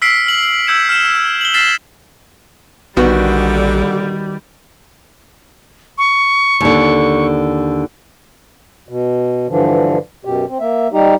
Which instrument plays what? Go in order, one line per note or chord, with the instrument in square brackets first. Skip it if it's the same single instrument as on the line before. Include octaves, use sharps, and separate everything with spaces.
[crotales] E6 F6 B6 C7 D7
F6 F#7
E6 G6 G#6 C#7 E7
F6 E7
F#7 G7
F6 A6 B6 C7 E7
[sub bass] A#1 [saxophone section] A#2 D3 [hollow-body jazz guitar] D#3 B3 F#4 [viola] G3
[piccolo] C#6
[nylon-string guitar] D#2 D3
[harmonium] B2
G2 D3 E3 F3
F#2 B2 G4
C4
A#3 E5
G3 D#4 G4